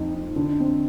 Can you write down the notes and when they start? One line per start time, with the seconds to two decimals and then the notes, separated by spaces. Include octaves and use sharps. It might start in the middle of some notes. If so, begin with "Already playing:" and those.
Already playing: F2 D#4
0.14 D#4
0.36 D3
0.60 C4